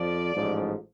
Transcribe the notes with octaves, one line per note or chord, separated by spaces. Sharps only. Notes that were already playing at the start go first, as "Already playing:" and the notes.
Already playing: F2 F3 D5
A1 G#2 F3